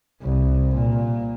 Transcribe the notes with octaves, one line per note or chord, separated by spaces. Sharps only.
C2
A#2